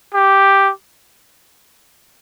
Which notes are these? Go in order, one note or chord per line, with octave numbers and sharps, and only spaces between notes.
G4